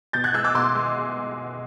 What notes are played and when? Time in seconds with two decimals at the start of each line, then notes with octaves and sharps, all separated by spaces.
0.13 B2 G6 A6
0.24 F#6 G#6
0.34 G#3 E6 F#6
0.44 D6 E6
0.55 B2 C6 D6
0.75 G#3